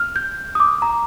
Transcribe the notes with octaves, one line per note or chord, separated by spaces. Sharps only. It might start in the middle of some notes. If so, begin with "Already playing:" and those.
Already playing: F6
G6
D#6
D6
A#5